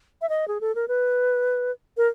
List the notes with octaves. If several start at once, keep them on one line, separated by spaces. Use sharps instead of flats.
E5
D#5
G#4
A4
A#4
B4
A#4